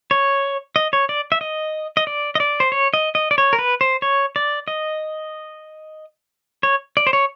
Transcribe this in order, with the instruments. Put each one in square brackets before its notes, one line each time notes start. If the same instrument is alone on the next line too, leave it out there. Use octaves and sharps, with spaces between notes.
[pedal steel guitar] C#5
D#5
C#5
D5
E5
D#5
D#5
D5
D#5
D5
C5
C#5
D#5
D#5
D5
C#5
A#4
B4
C5
C#5
D5
D#5
C#5
D5
C5
C#5